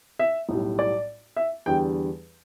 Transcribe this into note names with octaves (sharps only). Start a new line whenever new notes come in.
E5
B1 A2 G3
D5
E5
E2 D3 G3 G5